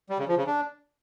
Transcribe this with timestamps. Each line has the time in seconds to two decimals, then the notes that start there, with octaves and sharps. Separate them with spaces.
0.10 G3
0.19 C#3
0.28 F3
0.37 C#3
0.47 D4